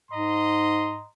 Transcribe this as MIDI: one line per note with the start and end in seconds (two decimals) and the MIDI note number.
0.11 1.04 44
0.11 1.07 75
0.11 1.07 82
0.11 1.07 84